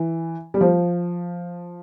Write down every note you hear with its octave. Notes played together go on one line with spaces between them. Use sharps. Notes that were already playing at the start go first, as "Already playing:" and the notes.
Already playing: E3
G3
F3